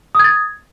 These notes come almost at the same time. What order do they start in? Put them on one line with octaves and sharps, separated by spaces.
D#6 G#6 A6